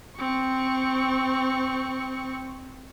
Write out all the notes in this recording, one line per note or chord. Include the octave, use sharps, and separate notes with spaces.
C4 C#6